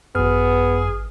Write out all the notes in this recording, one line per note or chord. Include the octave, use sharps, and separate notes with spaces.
G#1 F#2 B3 G#4 F6